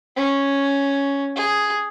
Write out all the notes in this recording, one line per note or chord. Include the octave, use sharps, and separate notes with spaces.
C#4
G#4